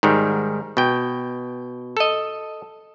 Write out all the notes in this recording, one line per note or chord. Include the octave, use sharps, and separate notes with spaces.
G#2 D#3 G3
B2 G5
A4 D#5